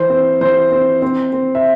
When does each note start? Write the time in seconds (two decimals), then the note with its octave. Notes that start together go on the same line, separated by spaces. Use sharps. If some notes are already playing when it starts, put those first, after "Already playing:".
Already playing: E3 C5
0.10 C4
0.41 E3 C5
0.71 C4
1.02 C4
1.33 C4
1.55 E5